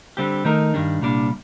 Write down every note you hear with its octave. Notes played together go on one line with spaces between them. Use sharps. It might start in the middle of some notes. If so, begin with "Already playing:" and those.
D3 G3 C4 G4
D#3 A3 D#4 A#4
G2 D#3 G3 D4
C2 A#2 G3 D4